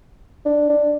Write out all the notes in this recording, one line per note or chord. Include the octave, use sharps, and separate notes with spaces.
D4
D4